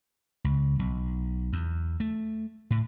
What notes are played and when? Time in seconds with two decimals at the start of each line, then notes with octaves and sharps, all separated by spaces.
0.44 C#2
0.79 B1
1.53 E2
2.00 A3
2.71 A2